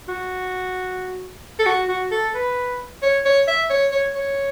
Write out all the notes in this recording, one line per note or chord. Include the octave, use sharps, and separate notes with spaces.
F#4
A4
F#4
F#4
A4
B4
C#5
C#5
E5
C#5
C#5
C#5